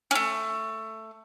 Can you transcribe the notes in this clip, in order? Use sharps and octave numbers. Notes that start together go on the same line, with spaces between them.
A3 C#4